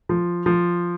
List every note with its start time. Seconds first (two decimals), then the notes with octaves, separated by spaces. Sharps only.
0.09 F3
0.46 F3